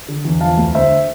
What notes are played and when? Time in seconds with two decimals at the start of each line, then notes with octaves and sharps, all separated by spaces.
0.08 D3
0.25 E2
0.41 F3 F5 A5
0.57 D2
0.75 D3 C5 E5